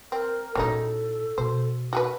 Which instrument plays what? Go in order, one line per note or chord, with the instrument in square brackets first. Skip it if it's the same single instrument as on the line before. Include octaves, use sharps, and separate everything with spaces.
[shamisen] C4 [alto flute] A#4
[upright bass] A#2 E4 [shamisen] C#3 F#3 D#4 [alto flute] A4
[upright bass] B2 [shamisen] C5
[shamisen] F#4 G#4 B4